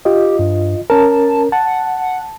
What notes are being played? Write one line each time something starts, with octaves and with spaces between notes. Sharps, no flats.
F4 G4 D#5
G2
C#4 A#4 A5
F#5 A5